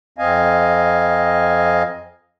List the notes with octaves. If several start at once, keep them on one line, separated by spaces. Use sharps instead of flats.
F2 C4 D#5 F5 G#5